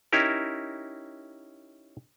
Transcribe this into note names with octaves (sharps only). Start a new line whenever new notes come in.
C#4 D#4 E4 G4 A#4